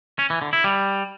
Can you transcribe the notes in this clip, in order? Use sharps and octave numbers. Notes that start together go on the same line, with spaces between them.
C#4
E3
D3
E4
G3